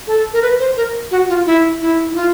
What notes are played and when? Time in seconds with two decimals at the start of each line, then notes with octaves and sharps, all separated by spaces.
0.07 A4
0.33 A#4
0.42 B4
0.60 C5
0.77 A#4
1.11 F#4
1.29 F4
1.46 E4
1.81 E4
2.10 E4
2.16 F4